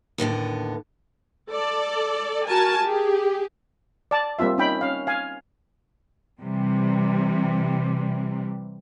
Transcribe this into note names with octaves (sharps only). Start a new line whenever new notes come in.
D#2 A2 D3 B3
A4 D5
F#4 A#4 G#5 A5
G4 G#4
D5 A5
G3 A#3 C4 F4 E5
C#4 D#4 G5 B5
C#4 F5
F5 G#5
C3 E3 G3